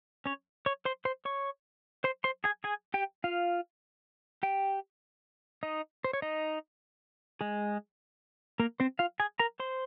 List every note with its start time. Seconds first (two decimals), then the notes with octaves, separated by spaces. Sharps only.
0.26 C#4 C#5
0.66 C#5 C#6
0.85 C5 C6
1.05 C5 C6
1.25 C#5 C#6
2.04 C5 C6
2.24 C5 C6
2.44 G#4 G#5
2.64 G#4 G#5
2.94 G4 G5
3.24 F4 F5
4.43 G4 G5
5.63 D#4 D#5
6.04 C5
6.13 C#5
6.22 D#4 D#5
7.41 G#3 G#4
8.60 A#3 A#4
8.80 C4 C5
8.99 F4 F5
9.20 G#4 G#5
9.39 A#4 A#5
9.60 C5 C6